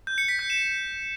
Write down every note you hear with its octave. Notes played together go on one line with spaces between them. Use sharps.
G6
C#7
B6
G6
E7